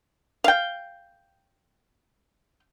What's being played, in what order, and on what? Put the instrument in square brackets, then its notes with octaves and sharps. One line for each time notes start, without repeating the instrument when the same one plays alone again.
[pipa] F5 G5